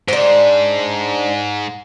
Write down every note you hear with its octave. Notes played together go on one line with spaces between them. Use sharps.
G#2 D4 C5